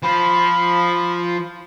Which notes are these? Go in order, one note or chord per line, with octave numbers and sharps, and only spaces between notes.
F3 B5